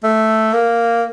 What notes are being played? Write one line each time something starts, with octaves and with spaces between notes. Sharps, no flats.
A3
A#3